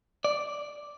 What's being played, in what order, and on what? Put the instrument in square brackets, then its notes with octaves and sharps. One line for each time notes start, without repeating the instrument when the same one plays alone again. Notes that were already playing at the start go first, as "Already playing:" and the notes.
[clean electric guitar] D5